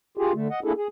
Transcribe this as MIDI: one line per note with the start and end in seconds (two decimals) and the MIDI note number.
0.17 0.33 65
0.17 0.33 67
0.17 0.33 68
0.33 0.48 50
0.33 0.48 57
0.50 0.60 75
0.50 0.60 78
0.64 0.73 58
0.64 0.73 62
0.64 0.73 64
0.64 0.73 68
0.64 0.73 69
0.77 0.88 68